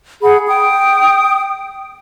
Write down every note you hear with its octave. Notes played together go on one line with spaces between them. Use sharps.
G#4 F#5 B5
G5 D#6